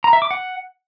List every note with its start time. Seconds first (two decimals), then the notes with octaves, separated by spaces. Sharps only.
0.04 A#5
0.13 E5
0.22 D6
0.31 F#5